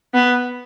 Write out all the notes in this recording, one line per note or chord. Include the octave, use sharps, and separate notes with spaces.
B3